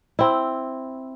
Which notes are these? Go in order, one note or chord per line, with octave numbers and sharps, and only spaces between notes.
C4 E4